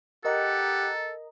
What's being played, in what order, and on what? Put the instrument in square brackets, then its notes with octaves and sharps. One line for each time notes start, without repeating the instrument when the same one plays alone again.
[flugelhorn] G4 [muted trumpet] A4 [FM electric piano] A#4 D#5 A#5 [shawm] F#5